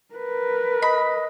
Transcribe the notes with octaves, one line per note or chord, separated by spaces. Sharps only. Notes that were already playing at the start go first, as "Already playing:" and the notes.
A#4 B4
D#5 B5